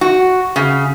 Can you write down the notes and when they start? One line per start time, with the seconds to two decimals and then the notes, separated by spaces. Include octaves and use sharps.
0.01 F#4
0.56 C#3